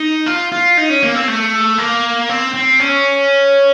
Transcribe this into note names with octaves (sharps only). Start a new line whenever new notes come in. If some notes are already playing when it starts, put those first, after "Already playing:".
Already playing: D#4
F4
F4
D#4
C#4
A#3
C4
A3
A#3
C4
C4
C#4